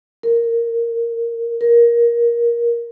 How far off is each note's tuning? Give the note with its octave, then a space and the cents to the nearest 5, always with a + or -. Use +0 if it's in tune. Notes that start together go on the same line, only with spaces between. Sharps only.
A#4 -10
A#4 +15